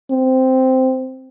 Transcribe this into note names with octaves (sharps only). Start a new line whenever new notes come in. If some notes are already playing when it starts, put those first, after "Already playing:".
C4